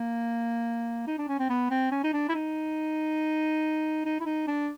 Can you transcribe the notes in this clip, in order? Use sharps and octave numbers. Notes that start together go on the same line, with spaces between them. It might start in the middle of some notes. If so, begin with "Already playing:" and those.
Already playing: A#3
D#4
D4
C#4
C4
B3
C4
C#4
D#4
D4
E4
D#4
D#4
E4
D#4
D4